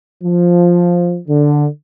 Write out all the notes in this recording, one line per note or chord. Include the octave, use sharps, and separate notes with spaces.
F3
D3